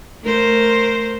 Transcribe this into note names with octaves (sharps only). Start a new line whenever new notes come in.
A3 A#4 C5